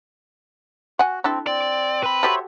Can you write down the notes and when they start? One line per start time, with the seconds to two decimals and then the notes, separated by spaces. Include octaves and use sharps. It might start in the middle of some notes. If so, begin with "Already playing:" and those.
0.99 F#4 F#5 G#5
1.24 C4 D4 E4 A4
1.47 C4 D5
2.03 B4 B5
2.23 F#4 G4 A4 C5 C#5 E5